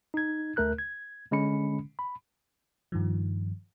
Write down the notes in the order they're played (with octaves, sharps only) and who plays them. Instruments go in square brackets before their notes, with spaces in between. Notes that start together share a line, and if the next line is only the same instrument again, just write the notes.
[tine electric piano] D#4 G#6
D2 A3 A#4 F#6 G6
G#6
D3 G#3 C#4 B5 C#7
B5
[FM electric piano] G2 D#3 F3